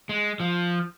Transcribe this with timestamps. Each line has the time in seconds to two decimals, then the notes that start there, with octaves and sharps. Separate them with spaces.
0.09 G#3
0.40 F3